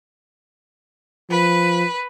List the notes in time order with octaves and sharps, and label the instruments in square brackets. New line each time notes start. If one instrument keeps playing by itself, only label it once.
[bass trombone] F3 [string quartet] B4